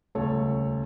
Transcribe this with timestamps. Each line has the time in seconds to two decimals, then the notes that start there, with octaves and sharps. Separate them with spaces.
0.15 D#1 C#2 A3 A4 C#5